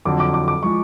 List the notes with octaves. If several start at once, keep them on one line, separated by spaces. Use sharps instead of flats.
F2 D3 F#3 D6
D6
D6
D6
F3 G#3 C#6